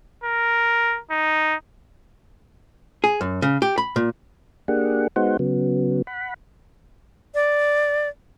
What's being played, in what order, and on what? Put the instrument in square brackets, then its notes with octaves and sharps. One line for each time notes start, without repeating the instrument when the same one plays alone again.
[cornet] A#4
D#4
[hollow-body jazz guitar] G#4
F#2
C#3
G4
B5
A#2
[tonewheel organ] A#3 D4 G4 G#4 F#5
G#3 B3 D#4 F#4 C5 F#5
C#3 F#3 B3
F#5 B5
[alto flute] D5